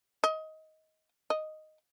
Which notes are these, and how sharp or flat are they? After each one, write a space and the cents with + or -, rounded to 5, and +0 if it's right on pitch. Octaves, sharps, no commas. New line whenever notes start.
D#5 +20
D#5 +0